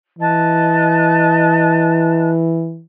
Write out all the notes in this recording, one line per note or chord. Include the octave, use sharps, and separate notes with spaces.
E3 D#5 A5 F#6